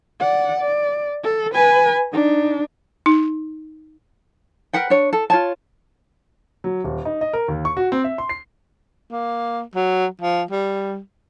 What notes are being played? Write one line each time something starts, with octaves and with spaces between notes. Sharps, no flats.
D5 F#5
D5
A4
B4 G#5
D4 D#4
D#4
A#4 B4 F#5 G5
D4 C#5
A4
F4 C#5 A5
F#3
D#1
D#4
D#5
A#4
D#2
C#6
F#4
C4
E5
C6
C7
A#3
F#3
F3
G3